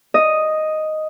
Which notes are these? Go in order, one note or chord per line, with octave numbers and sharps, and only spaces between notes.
D#5